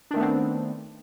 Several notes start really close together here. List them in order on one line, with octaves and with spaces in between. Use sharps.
D4 D#3 A3 B3 C4